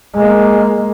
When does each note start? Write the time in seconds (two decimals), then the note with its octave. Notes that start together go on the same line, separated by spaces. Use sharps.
0.14 G#3 A#3